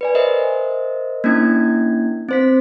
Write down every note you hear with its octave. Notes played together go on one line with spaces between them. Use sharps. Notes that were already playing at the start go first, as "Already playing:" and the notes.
B4 D5 G#5
A#4 C5 D#5 E5
A#3 C#4 D4 E4 G#6
C4 C5 B6